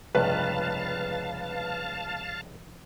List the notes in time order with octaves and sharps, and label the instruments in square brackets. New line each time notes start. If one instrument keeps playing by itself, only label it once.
[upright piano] F1 [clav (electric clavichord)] C#2 G2 [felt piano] B4 [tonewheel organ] F5 A5